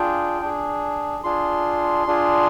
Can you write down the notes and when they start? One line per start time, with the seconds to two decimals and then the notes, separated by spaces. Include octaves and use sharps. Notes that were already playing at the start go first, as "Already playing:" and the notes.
Already playing: D4 F4 G#4 G5
0.42 D4 G#4
1.24 D4 F4 G#4 C6
2.07 D4 F4 G#4